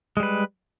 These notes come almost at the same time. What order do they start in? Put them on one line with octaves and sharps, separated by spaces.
G#3 G3 B4